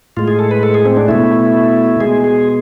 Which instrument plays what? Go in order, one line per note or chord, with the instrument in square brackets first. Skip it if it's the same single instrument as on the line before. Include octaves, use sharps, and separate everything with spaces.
[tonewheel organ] A2 G#3 F4
G#4
A4
B4
A4
G#4
C4
D4
B2 A3 E4
B2 G#3 G#4
G#4